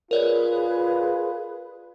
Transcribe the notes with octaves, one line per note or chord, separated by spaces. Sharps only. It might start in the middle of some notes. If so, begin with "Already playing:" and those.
F4 G#4 A#4 B4 C#5 D5